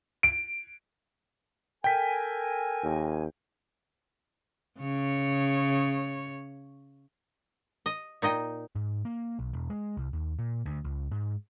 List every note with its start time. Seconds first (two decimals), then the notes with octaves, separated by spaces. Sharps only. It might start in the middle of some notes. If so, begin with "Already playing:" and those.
0.23 D7
1.84 A4 A#4 G5 G#5 B6
2.83 D#2
4.79 C#3 C#5
7.86 D#5
8.22 A#2 D#4 D#5 G5
8.75 G#2
9.05 A#3
9.39 B1
9.53 E1
9.70 G#3
9.97 C2
10.13 D#2
10.39 A#2
10.66 D2
10.85 C#2
11.12 G#2